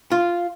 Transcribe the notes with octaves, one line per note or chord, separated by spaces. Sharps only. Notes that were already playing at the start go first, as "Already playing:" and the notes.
F4